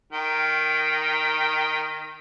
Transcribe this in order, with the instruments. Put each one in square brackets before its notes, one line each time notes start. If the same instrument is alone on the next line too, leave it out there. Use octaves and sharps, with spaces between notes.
[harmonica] D#3 G5